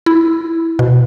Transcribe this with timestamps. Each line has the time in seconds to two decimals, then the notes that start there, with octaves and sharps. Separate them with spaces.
0.06 E4
0.79 B2